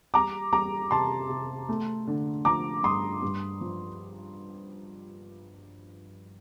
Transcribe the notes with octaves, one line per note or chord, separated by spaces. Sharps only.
G3 A#5 D6
G3 A#5 D6
C3 A5 C6
C3
A3
D3
F3 A#5 D6
G2 C6 D#6
G2
F3